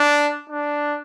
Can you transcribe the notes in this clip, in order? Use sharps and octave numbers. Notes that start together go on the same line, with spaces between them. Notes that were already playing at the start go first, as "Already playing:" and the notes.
Already playing: D4
D4